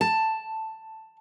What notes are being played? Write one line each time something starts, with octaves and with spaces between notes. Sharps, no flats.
A5